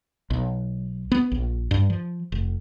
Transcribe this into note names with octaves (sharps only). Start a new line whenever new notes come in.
B1
B3
A#1
G2
F3
F1